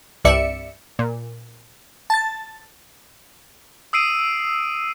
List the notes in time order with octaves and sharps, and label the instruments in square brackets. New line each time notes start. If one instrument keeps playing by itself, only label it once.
[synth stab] C2 G2 D5 E5 C#7
A#2
A5 A6
[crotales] D#6 E6 C7 D7 D#7